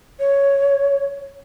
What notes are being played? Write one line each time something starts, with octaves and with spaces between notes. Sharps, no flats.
C#5